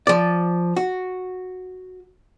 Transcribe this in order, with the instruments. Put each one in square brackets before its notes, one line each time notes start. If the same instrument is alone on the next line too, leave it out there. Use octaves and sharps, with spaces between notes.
[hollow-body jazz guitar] F3 D5
F#4